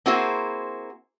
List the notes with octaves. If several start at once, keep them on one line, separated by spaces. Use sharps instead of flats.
A#3 C4 E4 F#4 G#4 C5